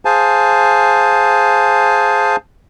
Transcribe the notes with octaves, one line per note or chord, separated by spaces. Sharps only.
G#4 C5 F5 G#5 A5